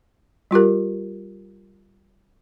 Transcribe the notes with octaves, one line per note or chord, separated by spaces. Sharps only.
G3 F4 G4 A#4